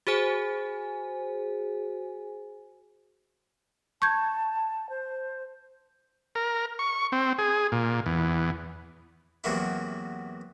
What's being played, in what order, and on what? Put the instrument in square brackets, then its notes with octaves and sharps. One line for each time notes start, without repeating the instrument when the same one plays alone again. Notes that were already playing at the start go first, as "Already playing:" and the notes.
[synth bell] F#4 G#4 C5 G#5
[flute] A5 [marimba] C#6 G6 G#6
[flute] C5
[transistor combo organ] A#4
C#6
C4
G#4
A#2
E2
[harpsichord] E2 C3 E3 F#3 A#3 E4